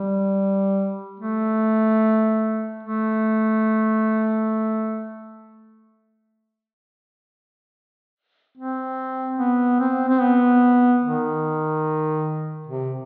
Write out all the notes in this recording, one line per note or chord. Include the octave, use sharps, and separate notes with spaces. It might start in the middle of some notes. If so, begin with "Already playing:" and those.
Already playing: G3
A3
A3
C4
B3
C4
C4
B3
D#3
C3